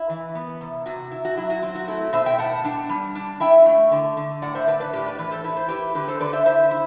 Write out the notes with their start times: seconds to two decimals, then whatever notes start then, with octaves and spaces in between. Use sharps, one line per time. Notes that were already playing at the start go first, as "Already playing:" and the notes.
Already playing: E4
0.09 E3
0.35 B3
0.61 C3
0.86 C3 F#4
1.12 E4
1.25 F#4
1.37 F#3 E4
1.50 F#4
1.62 C4
1.75 F#4
1.88 A3 E4
2.13 B2 C5 E5
2.26 E5 G5
2.38 A2 F#5 A5
2.64 D4
2.89 G3
3.15 D4
3.40 E4 E5 G5
3.66 A3
3.91 D3
4.17 D3
4.42 A2 D5 F#5
4.55 C5 E5
4.68 D4 B4 D5
4.80 B4 D5
4.93 A2 G4 B4
5.06 B4 D5
5.18 E3 B4 D5
5.31 A4 C5
5.44 E4 B4
5.56 C5
5.68 E4 G4 B4
5.95 D3 G4 B4
6.08 A4 C5
6.20 D3 B4 D5
6.33 C5 E5
6.45 E4 C5 E5
6.71 E4